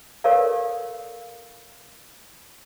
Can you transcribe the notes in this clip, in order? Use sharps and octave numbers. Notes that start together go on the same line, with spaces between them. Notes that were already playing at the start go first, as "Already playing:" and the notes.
G4 A4 A#4 C#5 D5 F5